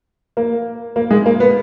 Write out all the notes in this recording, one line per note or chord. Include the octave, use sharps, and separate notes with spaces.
A#3
A#3
G#3
A#3
B3